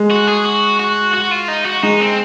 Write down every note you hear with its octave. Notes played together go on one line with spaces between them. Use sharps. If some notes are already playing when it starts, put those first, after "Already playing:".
Already playing: G#3
F#4
G#4
F#4
F#4
F#4
F4
D#4
F#4
G#3 D#4
C4